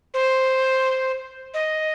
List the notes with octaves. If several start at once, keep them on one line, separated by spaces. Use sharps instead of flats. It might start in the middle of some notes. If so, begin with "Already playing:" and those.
C5
D#5